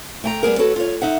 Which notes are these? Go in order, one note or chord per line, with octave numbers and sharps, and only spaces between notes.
A3 G5 A#5
G3 B3 G#4 A#4
F#4 A4 B4 C#5
F4 C#5
D#4 E5 F#5